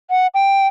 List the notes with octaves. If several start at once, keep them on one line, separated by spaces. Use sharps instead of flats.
F#5
G5